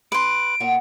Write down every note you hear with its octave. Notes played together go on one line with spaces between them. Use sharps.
B4 C6 D7
A#2 E4 F#5